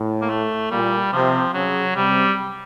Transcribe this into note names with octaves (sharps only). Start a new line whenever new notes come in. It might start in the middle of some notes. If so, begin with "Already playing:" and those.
Already playing: A2
A#3
A3
A#2 G3
C3 F3
C#3 F#3
C3 G3